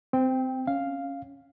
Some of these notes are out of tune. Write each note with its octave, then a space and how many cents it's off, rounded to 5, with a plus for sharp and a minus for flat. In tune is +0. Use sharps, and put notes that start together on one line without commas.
C4 -20 G5 +5
C#4 +0 F5 +0